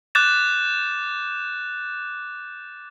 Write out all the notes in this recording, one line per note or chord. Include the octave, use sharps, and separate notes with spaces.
D6 F#6 G6 A6 E7